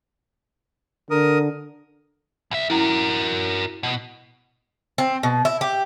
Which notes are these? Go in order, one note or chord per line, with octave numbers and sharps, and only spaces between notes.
D3 A#4 D#6
C2 E5
C#4 E4 F#4 A#4
B2
C4
B2
E4
G4